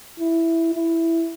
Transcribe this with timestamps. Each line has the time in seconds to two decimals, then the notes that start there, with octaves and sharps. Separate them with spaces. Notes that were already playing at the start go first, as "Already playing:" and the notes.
0.20 E4
0.75 E4